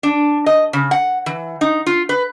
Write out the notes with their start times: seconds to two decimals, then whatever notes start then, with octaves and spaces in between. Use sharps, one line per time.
0.03 D4
0.46 D#5
0.73 C#3
0.91 F#5
1.26 E3
1.61 D#4
1.87 F4
2.09 B4